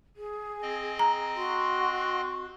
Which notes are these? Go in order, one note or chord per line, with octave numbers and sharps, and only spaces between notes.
G#4
C4 D#5
A#5
F#4 C6